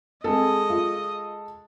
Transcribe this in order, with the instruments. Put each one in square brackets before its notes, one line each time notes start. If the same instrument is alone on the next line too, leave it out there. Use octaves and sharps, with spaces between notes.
[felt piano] G#3 A4 [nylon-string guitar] C4 G#4 [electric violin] D#5
[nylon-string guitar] F4